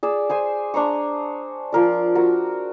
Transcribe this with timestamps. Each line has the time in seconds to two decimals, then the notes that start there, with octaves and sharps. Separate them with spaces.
0.03 G#4 D5 E6
0.30 G#4 C5 G#5
0.74 D4 C5 A#5 C#6
1.72 F3 A#4 D5
2.15 F#4 A#4